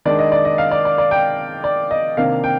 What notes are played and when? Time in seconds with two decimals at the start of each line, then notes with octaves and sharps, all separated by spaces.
0.05 D#3 G#3 D4 D5
0.19 D#5
0.32 D5
0.45 D#5
0.58 F5
0.71 D5
0.85 D5
0.98 D5
1.11 G5
1.64 D5
1.91 D#5
2.17 C3 D#3 A#3 D4 F5
2.44 G5